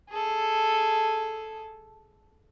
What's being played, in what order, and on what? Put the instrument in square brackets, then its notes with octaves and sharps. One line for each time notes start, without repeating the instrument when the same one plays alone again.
[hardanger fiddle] G#4 A4